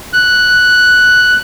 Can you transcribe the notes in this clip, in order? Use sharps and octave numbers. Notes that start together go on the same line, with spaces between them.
F#6